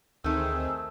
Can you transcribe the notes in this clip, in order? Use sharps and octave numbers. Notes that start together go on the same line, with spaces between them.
D2 D#3 A3 C4 D#4 G#4 E6